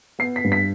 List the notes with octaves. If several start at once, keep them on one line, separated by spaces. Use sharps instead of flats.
B3 C7
B6
G2
B6